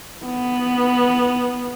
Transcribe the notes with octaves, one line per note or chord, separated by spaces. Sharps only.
B3